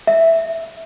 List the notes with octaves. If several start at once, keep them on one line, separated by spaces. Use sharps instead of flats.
E5